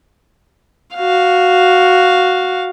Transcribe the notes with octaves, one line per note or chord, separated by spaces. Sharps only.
F#4 F5